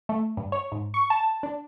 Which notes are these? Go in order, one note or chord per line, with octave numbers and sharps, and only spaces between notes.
A3
G2
C#5
G#2
C#6
A5
D4